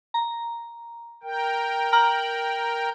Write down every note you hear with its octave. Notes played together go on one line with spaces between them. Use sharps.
A#5
A#4 G5
A#5 F6 F#7